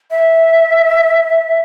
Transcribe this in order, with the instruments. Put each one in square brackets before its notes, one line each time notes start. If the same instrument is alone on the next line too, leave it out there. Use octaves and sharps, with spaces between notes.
[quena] E5